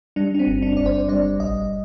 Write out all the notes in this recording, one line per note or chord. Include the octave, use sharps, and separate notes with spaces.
G3 D4
D4
C4
G1
D4
G1 D5
C5
G3 D5
A#1 D#5